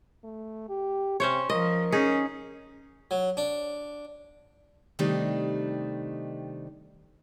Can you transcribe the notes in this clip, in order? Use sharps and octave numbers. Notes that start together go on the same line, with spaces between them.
A3
G4
C3 C#4 C5 C#5
F3 A#4 D#5
C#4 D#4 G#4
F#3
D4
C3 D#3 G3 A3 D4 D#4